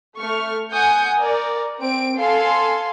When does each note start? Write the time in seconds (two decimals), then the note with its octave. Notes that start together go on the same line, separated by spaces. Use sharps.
0.18 A3 C#6 F6
0.73 F#5 G#5 D#6 G6 C#7
1.20 A#4 D5
1.79 C4 D7
2.17 A4 F5 G#5 C6